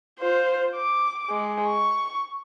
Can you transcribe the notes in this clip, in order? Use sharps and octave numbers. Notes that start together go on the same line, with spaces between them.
F4 C5
D6
G#3
C#6